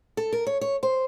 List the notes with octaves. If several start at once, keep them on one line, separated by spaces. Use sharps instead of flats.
A4
A#4
C#5
C#5
C5